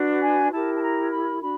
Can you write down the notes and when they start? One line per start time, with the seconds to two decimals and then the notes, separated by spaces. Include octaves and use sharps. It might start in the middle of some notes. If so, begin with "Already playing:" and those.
Already playing: D4 F#4 B4
0.21 G#5
0.52 E4 G4 A#4 A5
0.74 A5
0.81 A#5
1.11 B5
1.41 D4 F#4 B5